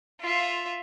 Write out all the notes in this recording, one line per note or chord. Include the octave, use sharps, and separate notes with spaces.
F4 E5